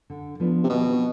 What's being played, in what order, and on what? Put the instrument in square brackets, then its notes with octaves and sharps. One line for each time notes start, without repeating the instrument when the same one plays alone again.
[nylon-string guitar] D3
F3 B3 D4
[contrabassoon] C3
[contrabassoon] B2 [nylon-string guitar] D#3